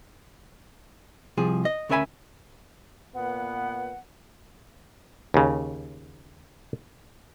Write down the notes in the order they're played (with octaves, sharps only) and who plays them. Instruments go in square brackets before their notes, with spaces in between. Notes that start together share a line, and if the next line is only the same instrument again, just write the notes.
[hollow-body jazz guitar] C2 F3 G#4
D#5
D2 C#4 A#4 E5 G#5 B5
[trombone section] A#2 B3 [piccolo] F#5
[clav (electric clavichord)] D#2 C#3